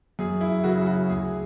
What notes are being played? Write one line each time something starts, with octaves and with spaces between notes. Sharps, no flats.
F#2 G#4
E4
C#3 F#3 F#4
F#4
D2 G#4